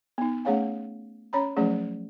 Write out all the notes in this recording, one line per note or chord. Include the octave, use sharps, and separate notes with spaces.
B3 D#4
A3 C#4 G#4 C#5 F5 G#5
C#4 C#5 A#5 B5
F3 F#3 A3 C#4 G#4 C5